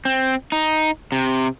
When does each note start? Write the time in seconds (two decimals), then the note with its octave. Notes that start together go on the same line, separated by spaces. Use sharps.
0.05 C4
0.52 D#4
1.12 C3